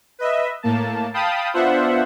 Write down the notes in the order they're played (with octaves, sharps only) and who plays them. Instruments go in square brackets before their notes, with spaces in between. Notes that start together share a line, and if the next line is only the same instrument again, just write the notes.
[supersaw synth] B4 D#5 E5
A2 A#3 A5
F5 G5 A5 B5 D#6
B3 D4 F4 C5 E5 F#5